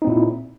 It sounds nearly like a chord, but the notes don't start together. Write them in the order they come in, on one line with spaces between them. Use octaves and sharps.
D#4 C4 A#2 E4